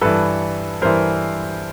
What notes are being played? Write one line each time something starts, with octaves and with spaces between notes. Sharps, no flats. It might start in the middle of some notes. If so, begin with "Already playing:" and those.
G2 E3 A4 B4
G2 E3 A#4 C5